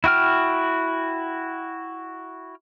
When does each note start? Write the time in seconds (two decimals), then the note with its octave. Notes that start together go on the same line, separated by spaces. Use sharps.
0.04 E4 F#4 G5 F6